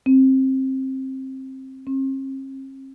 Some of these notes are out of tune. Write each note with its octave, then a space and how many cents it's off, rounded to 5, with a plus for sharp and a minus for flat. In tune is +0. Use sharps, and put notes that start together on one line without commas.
C4 +20
C4 +45